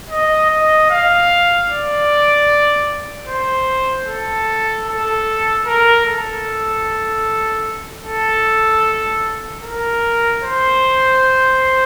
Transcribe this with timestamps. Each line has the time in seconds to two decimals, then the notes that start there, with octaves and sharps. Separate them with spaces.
0.10 D#5
0.50 D#5
0.90 F5
1.69 D5
3.28 C5
4.07 A4
4.86 A4
5.66 A#4
6.05 A4
8.04 A4
9.62 A#4
10.42 C5